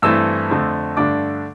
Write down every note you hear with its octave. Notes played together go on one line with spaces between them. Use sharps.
G2 E3 A3 C4 E6
F2 D3 A3 C4
G2 D3 A3 D4 D6